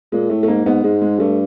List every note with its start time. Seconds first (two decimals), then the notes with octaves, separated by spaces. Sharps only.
0.12 A#2 G#3
0.30 A2 A3
0.43 A3
0.48 G#2 A#3
0.65 G#2 B3
0.84 G#2 G#3
1.02 G#3
1.19 G2 A3